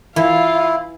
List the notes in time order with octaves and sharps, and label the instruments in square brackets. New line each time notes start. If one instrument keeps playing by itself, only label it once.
[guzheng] E3 [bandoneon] E4 [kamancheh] F4 F5